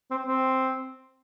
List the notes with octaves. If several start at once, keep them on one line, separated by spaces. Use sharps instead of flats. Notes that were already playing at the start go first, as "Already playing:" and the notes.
C4
C4